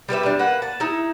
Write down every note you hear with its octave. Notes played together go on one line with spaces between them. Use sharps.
G3 G4 B4 E5
G3 D4
A#3 B4 F#5
A5
D#4 E4